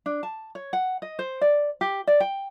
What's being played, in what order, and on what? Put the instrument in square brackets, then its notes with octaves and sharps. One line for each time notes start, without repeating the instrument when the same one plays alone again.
[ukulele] D4
A5
C#5
F#5
D#5
C5
D5
G4
D5
G5